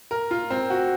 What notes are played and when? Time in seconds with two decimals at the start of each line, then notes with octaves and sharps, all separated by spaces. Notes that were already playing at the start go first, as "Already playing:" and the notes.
0.11 A#4
0.31 F4
0.50 C4
0.70 F#4